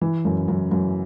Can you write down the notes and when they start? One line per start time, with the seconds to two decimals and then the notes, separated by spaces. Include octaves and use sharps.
0.01 E3
0.25 F#2
0.48 F#2
0.71 F#2